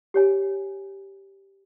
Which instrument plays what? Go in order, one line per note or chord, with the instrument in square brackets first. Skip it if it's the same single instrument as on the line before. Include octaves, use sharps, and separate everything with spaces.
[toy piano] G4 C#5 G#5